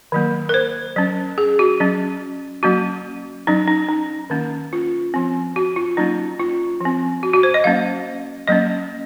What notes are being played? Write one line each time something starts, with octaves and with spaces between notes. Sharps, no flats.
D#3 F#3 A#3
A#4
C5
F#3 C#4
G#4
F#4
F#3 C#4
F#3 A#3 C#4 F#4
F#3 C#4 D#4
D#4
D#4
D#3 A#3 C#4
F4
F3 C4
F#4
F4
F#3 A#3 C#4 D#4
F4
F3 C4
F#4
F#4
C5
D#5
F#3 A#3 C#4 F5
F#3 A#3 C#4 D#5